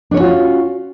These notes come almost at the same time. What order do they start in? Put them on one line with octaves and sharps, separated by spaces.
D4 C#5 C#4 F#4 F4